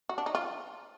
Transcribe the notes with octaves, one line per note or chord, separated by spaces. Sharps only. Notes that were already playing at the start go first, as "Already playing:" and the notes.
F#4
D4
D#4
F4